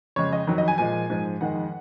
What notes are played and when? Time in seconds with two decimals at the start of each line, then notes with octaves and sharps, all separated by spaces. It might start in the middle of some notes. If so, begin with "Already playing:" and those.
0.16 F2 C#3 G#3 C#5
0.33 D#5
0.47 F2 D#3 F#3
0.58 D#5
0.68 G#5
0.78 A#2 F3 G#3 G#5
1.10 G#2 F3 G#3
1.41 F2 D#3 G#3 F#5